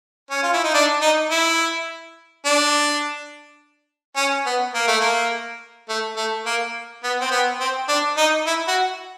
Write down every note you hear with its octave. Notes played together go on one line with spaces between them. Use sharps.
C#4
F4
E4
D#4
D4
D#4
E4
D4
C#4
B3
A#3
A3
A#3
A3
A3
A#3
B3
C4
B3
C4
D4
D#4
E4
F#4